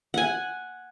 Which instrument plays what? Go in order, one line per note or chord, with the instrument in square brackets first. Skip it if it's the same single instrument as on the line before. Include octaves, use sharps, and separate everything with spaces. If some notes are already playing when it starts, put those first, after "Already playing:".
[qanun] F#5 G#5